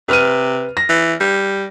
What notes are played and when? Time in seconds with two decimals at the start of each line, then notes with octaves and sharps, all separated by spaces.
0.09 C3 B4 F6 D#7
0.77 A#6
0.89 E3
1.21 G3